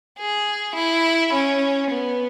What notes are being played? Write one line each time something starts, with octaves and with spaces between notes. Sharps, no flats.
G#4
E4
C#4
B3